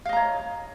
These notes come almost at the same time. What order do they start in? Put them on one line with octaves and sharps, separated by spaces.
F5 D#5 A#5 C#5